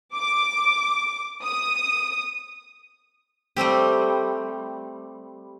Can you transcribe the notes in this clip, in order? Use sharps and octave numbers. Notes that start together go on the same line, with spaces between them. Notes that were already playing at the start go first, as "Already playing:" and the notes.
D6
D#6
G3 A3 C4 G4